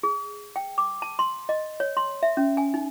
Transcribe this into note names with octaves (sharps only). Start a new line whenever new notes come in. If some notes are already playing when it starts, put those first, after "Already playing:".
G#4
G5
D6
A5
C6
D#5
C#5
C6
E5
C#4
G#5
D#4